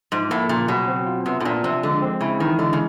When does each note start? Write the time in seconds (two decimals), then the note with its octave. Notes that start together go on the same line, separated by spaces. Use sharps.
0.12 G#2 F3
0.30 A2 A#3
0.49 A#2 C#3
0.68 B2 F#3
0.88 C4
1.06 F4
1.26 C3 B3
1.40 A2
1.45 A#2 D4
1.64 C3 F3
1.83 D3 G#3
2.02 C4
2.21 C#3 E4
2.40 D#3 E3
2.59 D3 G#3
2.73 C#3